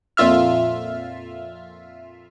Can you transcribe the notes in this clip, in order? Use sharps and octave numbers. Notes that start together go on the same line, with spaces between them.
F2 A#2 F4 E5 F6